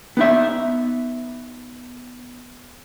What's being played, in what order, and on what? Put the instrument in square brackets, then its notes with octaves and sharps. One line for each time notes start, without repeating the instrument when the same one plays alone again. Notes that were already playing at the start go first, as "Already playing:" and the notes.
[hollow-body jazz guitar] B3 D#4 E5